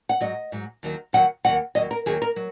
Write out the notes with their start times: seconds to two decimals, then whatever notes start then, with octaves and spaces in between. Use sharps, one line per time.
0.09 F#5
0.21 G#2 F#3 D#5
0.52 G#2 F#3
0.83 D#2 D#3 F#3
1.13 D#2 D#3 F#3 F#5
1.44 D#2 C#3 F#3 F#5
1.75 D#2 C#3 F#3 D#5
1.91 A#4
2.06 D#2 D#3 F#3 G#4
2.22 A#4
2.36 F#3